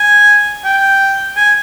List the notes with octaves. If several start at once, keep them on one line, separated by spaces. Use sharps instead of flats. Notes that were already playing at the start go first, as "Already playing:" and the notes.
Already playing: G#5
G5
G#5